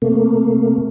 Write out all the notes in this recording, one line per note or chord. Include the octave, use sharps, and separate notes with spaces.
C3 A3 A#3